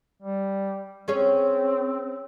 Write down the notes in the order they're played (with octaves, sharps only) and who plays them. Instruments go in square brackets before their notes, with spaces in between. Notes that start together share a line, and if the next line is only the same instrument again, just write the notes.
[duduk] G3
[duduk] C4 [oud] C#4 G#4 C#5